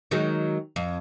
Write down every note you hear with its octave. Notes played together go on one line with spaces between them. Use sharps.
D#3 F#3 G#3
F2